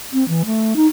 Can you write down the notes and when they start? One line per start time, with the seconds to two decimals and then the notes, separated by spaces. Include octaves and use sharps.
0.13 C4
0.28 E3
0.45 A3
0.76 D#4